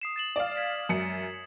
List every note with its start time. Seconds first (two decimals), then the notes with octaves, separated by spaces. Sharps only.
0.02 D#6 C7 E7
0.16 A6 E7 F#7
0.36 D5 F5
0.56 G#6 B6 C7
0.89 F#2 C#7